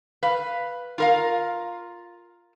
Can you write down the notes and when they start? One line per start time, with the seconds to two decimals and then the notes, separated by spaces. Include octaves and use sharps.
0.23 B4 F5
0.98 F4 A#4 F5